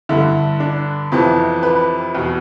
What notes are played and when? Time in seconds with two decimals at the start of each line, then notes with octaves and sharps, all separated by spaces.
0.09 G2 D3 E4
0.60 D4
1.12 F2 C3 E3
1.63 B4
2.15 E2 B2